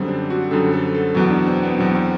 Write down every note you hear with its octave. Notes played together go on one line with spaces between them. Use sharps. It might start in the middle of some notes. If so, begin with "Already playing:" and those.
Already playing: F#2 D3 G3 C4
D4
F#4
F#2 D3 G3 A4
A4
A4
E2 B2 F#3 F#4
D4
C4
B3
E2 B2 F#3 C4
C4